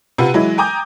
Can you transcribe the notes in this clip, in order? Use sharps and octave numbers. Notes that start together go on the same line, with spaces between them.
C3 F4 B4 F#5 D#7
E3 F#3 G#3 E4
G5 G#5 A#5 D6 D#6 G6